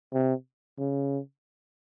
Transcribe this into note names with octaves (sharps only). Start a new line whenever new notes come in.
C3
C#3